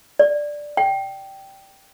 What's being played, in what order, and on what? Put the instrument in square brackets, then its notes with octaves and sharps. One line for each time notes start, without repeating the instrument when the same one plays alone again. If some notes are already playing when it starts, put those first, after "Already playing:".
[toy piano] D5
G5